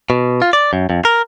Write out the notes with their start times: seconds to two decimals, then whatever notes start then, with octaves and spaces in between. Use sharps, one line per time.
0.10 B2
0.42 F4
0.53 D5
0.73 F#2
0.90 F2
1.05 A#4